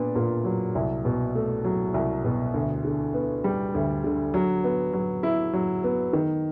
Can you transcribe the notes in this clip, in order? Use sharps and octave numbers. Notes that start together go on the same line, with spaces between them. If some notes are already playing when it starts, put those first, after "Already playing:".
Already playing: A#2 B3 D4
A#2
F#3
C2
B2
A3
F#3
C2
B2
D2
D3
B3
G3
D2
D3
F#3
B3
F#3
E4
F#3
B3
D#3